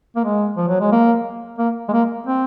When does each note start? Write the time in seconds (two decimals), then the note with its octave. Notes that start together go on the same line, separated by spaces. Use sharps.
0.16 A#3
0.24 G#3
0.57 F3
0.68 F#3
0.80 G#3
0.92 A#3
1.58 A#3
1.88 G#3
1.92 A#3
2.27 C4